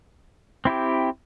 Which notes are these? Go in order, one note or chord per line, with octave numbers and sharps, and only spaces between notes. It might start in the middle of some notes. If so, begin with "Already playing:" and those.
C4 E4 G4